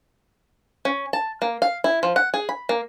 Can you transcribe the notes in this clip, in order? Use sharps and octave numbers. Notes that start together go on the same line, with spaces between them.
C#4
A5
A#3
F5
E4
F3
F#5
G#4
B5
A#3